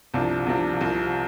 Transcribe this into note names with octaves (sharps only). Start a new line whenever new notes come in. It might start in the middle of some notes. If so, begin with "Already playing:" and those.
C2 C3 F3 D4
C2 C3 F3 D4
C2 C3 F3